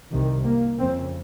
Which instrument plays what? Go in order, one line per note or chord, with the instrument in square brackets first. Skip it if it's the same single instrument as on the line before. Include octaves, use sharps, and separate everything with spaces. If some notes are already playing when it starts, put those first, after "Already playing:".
[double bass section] C2 C3 D#3
A#3
F2 C#3 C4